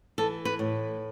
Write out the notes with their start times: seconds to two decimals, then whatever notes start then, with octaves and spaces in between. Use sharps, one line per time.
0.18 E3 A4
0.45 B4
0.59 A2